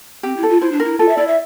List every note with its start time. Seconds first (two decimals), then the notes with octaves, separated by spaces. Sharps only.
0.23 C4 G4
0.37 E4
0.43 A4
0.49 F4
0.61 E4 C5
0.72 D4
0.80 E4 A#4
0.99 F4 A4
1.08 E5
1.17 E4 D5
1.27 E5